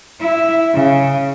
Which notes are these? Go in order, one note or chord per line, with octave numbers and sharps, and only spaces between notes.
E4
C#3